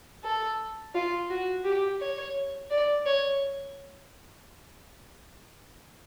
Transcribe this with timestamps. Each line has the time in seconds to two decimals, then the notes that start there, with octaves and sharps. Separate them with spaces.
0.24 A4
0.95 F4
1.30 F#4
1.64 G4
2.00 C#5
2.70 D5
3.06 C#5